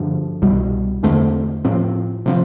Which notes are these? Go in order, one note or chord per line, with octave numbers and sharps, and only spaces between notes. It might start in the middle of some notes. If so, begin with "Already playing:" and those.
Already playing: G2 D3 F3
C2 B2 G3
E2 D3 A3 C4
A2 F3 C4
C3 F3 C4